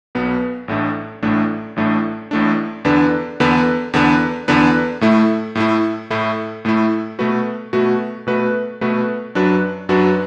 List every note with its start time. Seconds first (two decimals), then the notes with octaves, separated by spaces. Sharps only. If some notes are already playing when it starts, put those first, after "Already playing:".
0.15 B1 B2 B3
0.68 A1 A2 A3 D4
1.23 A1 A2 A3 D4
1.76 A1 A2 A3 D4
2.31 A1 A2 A3 D4
2.85 E2 D3 B3 D4 B4
3.40 E2 D3 B3 D4 B4
3.93 E2 D3 B3 D4 B4
4.48 E2 D3 B3 D4 B4
5.01 A2 A3 E4
5.55 A2 A3 E4
6.10 A2 A3 E4
6.65 A2 A3 E4
7.19 B2 A3 F#4 B4
7.73 B2 A3 F#4 B4
8.27 B2 A3 F#4 B4
8.81 B2 A3 F#4 B4
9.35 F#2 F#3 D4 F#4 B4
9.89 F#2 F#3 D4 F#4 B4